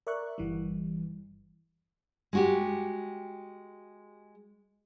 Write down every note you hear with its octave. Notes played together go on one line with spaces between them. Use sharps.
A#4 D5 E5 C#6 F#6
G1 E3 G3
G#3 F#4 G4